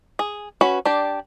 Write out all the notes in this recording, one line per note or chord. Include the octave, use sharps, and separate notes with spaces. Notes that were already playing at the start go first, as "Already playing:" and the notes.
G#4
C#4 F#4 B4
D4 G4 D5